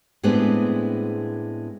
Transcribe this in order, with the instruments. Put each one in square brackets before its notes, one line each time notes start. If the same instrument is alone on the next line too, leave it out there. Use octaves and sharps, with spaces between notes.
[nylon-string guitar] A2 G#3 B3 C4 D4 G#4